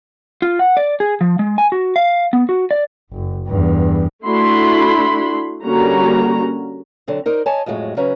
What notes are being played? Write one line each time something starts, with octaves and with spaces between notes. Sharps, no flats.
F4
F#5
D5
G#4
F3
G#3
G#5
F#4
F5
B3
F#4
D5
F#1
E2 G2
A3 D4 E4 F#4 B5 C6
D3 G3 A#3 C#4 F#4 A#5
D3 F#3 C4
D#4 A#4 C5 D5
C#5 D#5 G#5 A5
F2 A2 F#3 G#3
C#3 F#3 C#4 B4 A#5